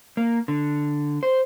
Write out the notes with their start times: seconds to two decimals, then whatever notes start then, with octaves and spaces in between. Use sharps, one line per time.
0.17 A#3
0.48 D3
1.23 C5